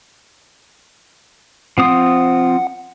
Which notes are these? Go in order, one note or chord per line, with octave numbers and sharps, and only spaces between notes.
F3 C4 F#5 D#6